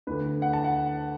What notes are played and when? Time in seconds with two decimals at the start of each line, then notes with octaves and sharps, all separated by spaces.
0.07 D2 D3 B4
0.42 F#5
0.53 A5
0.64 F#5